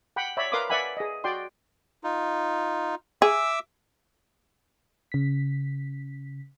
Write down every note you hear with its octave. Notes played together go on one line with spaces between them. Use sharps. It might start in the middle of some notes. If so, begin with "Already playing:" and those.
F#5 G5 B5
C#5 D5 E5 B5
A#4 B4 F5 C6 D6 D#6
B4 D5 E5 F#5 G#5 B5
G#4 D#5
F#4 D5 G5 C6
D#4 F4
G#4 E5 D6 E6
C#3 B6